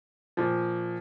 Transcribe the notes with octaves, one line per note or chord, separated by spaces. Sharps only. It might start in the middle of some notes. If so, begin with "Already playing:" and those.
A#2 F3